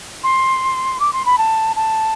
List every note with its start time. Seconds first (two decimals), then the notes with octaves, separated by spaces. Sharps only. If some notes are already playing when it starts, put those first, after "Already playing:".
0.24 C6
1.00 D6
1.13 C6
1.25 B5
1.38 A5
1.76 A5